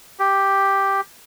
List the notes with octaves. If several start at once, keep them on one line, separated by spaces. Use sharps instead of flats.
G4